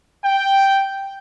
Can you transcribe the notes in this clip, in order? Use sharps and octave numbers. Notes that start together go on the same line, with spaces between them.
G5